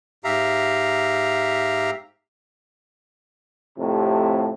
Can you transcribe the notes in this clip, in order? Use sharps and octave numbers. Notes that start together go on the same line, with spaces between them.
G#2 G4 E5 F5 A#5
F2 A2 C3